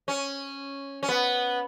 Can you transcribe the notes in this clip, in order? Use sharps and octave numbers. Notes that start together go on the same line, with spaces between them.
C#4
C#4
B3